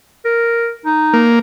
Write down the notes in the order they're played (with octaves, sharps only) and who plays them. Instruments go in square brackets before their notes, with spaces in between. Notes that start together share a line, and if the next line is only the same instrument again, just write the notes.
[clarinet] A#4
D#4
[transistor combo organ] A#3